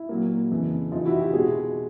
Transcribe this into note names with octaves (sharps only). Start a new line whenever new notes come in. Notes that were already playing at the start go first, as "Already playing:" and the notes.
Already playing: E4
A#2 F#3 A#3
F2 C#3 E3
F2 C3 E3 D#4 F4
E4 F#4
F4 G4
B2 G#3 F#4 G#4